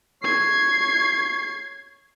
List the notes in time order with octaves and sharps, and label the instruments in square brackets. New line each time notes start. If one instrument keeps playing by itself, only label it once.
[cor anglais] C#5 [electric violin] G#6 C7